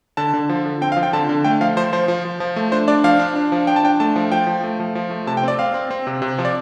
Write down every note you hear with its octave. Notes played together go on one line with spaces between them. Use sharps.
D3 A5
D3
F3
D3
C4 G5
F5
F3
G5
D3 A5
D3
A3 G5
F3 F5
F3 C5
F3 C5
F3
F3
F3
A3
D4 C5
D4 D5
F3 F5
D4
D4
F3
D4 G5
A5
D4 G5
A3 A5
F3
F3 G5
F3
A3
F3
F3
A3
C3 A5
G5
C4 D5
C4 F5
C4
C4
C3
C3
F3
D5